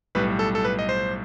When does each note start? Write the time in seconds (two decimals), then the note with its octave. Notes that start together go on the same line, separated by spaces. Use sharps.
0.15 B1 A2 G3 B4
0.39 A4
0.55 A4
0.65 B4
0.79 D#5
0.89 C5